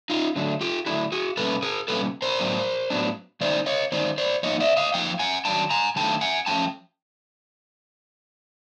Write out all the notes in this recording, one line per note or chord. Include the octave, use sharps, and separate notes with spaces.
D#4 F4
D3 F#3 A3 D4
F4 G4
D3 F#3 A3 D4 E4 F#4
F#4 G#4
B2 G3 A#3 C#4 A4 B4
G#4 A#4
B2 G3 A#3 C#4 A4 B4
A#4 C5
A2 F#3 B3 D4
A2 F#3 B3 D4
D#3 G#3 C4 D#4 C5 D5
C#5 D#5
D#3 G#3 C4 D#4 C5 D5
C5 D5
F3 A#3 D#4 C#5 D#5
D5 E5
D#5 F5
F3 A#3 D#4 F5 G5
F#5 G#5
D#3 F#3 A3 D4 G5 A5
G#5 A#5
D#3 F#3 A3 D4 G5 A5
F#5 G#5
F3 A3 C#4 G5 A5